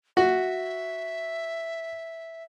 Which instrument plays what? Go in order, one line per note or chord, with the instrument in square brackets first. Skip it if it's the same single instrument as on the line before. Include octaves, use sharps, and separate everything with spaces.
[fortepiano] F#4 [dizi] E5